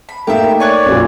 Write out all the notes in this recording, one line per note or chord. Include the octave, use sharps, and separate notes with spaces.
B5
A3 A#3 D#4 G4 A#4 E5
C#5 D5 G#5 C#6 F#6
B1 F#2 A#2